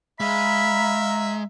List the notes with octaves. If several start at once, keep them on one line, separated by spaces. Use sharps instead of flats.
G#3 E5 F5 A#5 B5